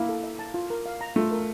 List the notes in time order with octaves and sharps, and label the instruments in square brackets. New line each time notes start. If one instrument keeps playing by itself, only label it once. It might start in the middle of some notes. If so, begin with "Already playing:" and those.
Already playing: [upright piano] A#3 [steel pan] E4
[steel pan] A4
E5
A5
F4
A#4
F5
A#5
[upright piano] A3 [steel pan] F4
[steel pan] A#4